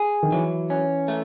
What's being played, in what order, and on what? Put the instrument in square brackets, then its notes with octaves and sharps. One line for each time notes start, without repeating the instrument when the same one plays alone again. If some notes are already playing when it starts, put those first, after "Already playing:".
Already playing: [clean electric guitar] G#4
[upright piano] D#3
[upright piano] E3 [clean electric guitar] F#3
[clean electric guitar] C#4
A3